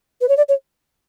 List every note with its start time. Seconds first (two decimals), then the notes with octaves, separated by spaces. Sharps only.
0.21 B4
0.29 C#5
0.37 D5
0.49 C#5